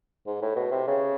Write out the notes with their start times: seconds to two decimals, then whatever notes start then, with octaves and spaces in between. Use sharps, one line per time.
0.27 G#2
0.42 A2
0.56 B2
0.71 C3
0.87 C#3